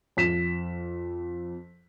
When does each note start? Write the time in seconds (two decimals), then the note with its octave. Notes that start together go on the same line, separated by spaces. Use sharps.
0.17 F2 B6 E7